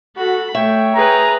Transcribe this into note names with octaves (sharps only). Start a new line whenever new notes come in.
F#4 A4 B5
A3 C#5 E5 G5
G#4 B4 A#5